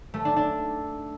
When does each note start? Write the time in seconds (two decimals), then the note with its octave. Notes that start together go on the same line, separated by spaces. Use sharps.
0.14 A3
0.25 D4
0.36 D4